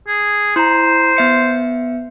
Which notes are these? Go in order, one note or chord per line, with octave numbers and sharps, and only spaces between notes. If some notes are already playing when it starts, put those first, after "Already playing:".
G#4
E4 C5 A#5
B3 E5 C#7